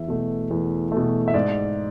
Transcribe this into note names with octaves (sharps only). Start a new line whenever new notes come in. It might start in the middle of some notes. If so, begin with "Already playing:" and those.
Already playing: E2 E5
B2 A3
E2
B2 A3
E5
G#2 D5